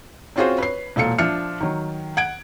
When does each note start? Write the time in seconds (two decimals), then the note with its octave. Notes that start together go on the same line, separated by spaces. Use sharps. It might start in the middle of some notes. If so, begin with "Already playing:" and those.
0.36 C4 C#4 F4 F#4 G#4 C5
0.58 B4 C#5 C7
0.96 E1 A#2 A4 F5 C#7
1.18 F3 D4 F4 E5 F6 C#7
1.60 D#3 F#3
2.17 F#5 G#6 D7